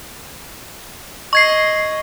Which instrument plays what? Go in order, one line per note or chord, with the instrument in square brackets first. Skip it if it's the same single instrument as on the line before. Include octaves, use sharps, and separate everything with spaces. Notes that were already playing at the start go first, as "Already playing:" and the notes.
[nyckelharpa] D#5 [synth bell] C#6 G#6 C7